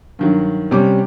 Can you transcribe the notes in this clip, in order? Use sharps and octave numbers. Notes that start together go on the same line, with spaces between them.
G2 D#3 F#3
C3 G3 C#4 D6